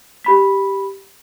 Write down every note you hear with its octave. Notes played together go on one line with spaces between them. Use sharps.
G4 B5 B6